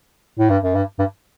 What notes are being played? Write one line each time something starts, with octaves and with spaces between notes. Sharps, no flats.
A2
G2
F#2
G2
G2